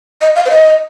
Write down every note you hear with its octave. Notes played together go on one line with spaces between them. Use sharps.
D#5
F5
C5
D#5